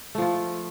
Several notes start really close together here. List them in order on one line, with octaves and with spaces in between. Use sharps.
A3 F3 F4